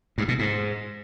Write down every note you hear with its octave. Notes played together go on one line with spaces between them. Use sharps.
G2
B2
G#2